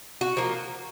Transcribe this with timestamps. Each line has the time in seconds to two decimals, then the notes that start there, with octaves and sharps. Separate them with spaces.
0.21 F#4
0.37 F3 A#3